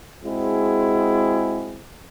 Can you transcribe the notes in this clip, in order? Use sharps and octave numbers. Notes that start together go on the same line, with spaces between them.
G#3 C4 E4 F#4 G#4